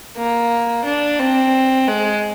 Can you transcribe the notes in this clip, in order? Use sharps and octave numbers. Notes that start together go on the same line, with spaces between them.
A#3
D4
C4
G#3